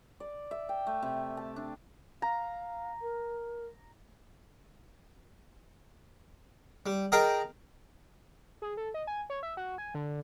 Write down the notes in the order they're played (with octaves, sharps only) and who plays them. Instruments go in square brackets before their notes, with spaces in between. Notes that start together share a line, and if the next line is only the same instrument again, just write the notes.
[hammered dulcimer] D5
E5
G5
A3
C3
A5
D4
[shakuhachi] F5 [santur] A#5
[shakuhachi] A#4
[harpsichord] G3
G#4 A#4 D#5 G5 A5 A#5
[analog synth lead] G#4
A4
D#5
G#5
C#5
E5
F#4
G#5
D3